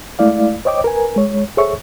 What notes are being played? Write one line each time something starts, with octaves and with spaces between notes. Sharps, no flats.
G#3 A3 E4 D5 F5
C5 C#5 D#5 G5 D6
A#4 B4 G#5
G#3 C#5
G#4 A4 C5 C#5 E5 C#6